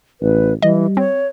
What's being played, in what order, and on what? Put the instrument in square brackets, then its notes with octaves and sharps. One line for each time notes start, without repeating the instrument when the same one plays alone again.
[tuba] A1 [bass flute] B4
[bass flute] E3 [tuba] G3 [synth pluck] D#5
[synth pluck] C4 [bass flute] C#5